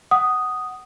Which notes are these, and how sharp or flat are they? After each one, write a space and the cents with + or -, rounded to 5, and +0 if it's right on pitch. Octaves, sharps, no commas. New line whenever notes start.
F#5 +10 D#6 +0